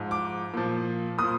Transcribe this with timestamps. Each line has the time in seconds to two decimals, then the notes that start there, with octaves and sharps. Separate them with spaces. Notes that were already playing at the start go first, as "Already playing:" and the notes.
Already playing: G#2 F3
0.11 D6
0.54 A#2 F3
1.18 A#2 F3 D#6